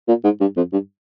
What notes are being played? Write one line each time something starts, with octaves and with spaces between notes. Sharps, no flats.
A#2
G#2
G2
F2
G2